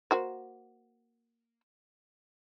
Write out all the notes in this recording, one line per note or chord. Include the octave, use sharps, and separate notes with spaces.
A#3 F#4 C5